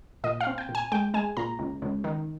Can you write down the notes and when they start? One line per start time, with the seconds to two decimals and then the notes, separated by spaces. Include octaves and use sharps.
0.24 A#2 D#5
0.41 F5
0.47 C4
0.58 G5
0.69 A#2
0.75 G#5
0.92 G#3 G5
1.14 G#3 G#5
1.37 A#2 A#5
1.59 C#2
1.82 C#2
2.04 D#3